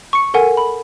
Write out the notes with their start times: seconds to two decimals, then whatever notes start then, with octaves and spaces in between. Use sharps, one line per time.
0.13 C#6 C#7
0.34 A4 A#4 F#5 G#5
0.57 B5